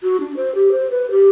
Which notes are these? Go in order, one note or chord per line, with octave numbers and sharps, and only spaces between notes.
F#4
D4
C5
G4
C5
B4
G4